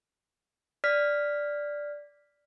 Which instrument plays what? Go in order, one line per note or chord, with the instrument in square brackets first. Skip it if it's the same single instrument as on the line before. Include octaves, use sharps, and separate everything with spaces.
[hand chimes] D5 F6 B6